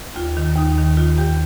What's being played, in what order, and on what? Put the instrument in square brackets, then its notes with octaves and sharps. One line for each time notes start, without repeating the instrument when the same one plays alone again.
[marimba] D#2 F4
D#3
D#2 D#4
D#3
D#3 F4
D#2 G4